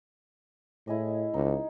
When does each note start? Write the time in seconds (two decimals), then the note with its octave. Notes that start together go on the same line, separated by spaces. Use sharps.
0.87 A2 E4 G#4 D#5
1.34 C#2 D#4